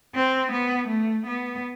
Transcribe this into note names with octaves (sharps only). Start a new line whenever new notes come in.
C4
B3
A3
B3